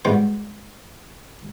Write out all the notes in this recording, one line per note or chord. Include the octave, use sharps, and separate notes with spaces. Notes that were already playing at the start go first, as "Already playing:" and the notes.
G#2 B2 G3 G5